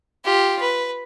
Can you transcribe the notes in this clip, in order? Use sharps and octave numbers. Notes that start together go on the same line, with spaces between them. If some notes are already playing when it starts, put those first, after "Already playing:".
F4 G4
B4